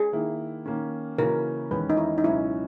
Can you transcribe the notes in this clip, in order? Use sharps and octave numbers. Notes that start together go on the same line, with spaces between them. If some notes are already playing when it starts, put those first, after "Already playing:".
Already playing: G#4
D#3 A#3 E4
D#3 A#3 C#4
C#3 E3 A#3 C#4 F#4 A#4
E2 D#3 G#3 C#4 B4
D#4
E4
D#4
C#2 B2 F#3 C#4 E4 F#4